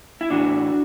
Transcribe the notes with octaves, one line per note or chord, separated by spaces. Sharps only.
E4
A2 E3 D4 F#4